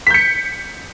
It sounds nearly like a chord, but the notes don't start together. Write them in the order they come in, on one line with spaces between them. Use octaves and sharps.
B6 G6 C#7